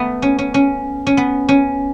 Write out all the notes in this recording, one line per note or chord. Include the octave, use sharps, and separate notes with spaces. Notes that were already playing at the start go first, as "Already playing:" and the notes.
Already playing: A3 B3
C#4
C#4
C#4
C#4
B3
C#4